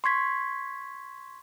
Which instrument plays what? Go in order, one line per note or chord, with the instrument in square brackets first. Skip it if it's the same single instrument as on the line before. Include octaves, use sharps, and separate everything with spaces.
[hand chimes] C6 C#6 G#6 B6